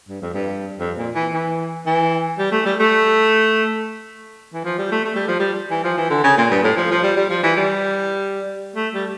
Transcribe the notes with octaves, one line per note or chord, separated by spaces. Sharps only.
G2
F2
G2
F2
A#2
E3
E3
E3
G3
A3
G3
A3
E3
F3
G3
A3
A3
G3
F3
G3
E3
F3
E3
D3
C#3
A#2
G2
A2
F3
F3
G3
G3
F3
E3
G3
A3
G3